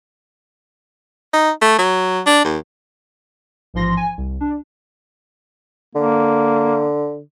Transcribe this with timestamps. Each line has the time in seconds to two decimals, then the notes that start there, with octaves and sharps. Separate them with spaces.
1.33 D#4
1.62 A3
1.79 F#3
2.26 D4
2.45 D#2
3.74 A1 G#2 F3 C6 A#6
3.97 G#5
4.18 C2
4.40 D4
5.95 D3 A#3